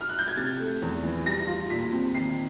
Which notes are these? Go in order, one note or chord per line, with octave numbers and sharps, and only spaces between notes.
F6
F#6
G6
G#6
C3 A6
A3
E2
E3
G3 A#6
F4
A#2 B6
C4
D#3 C7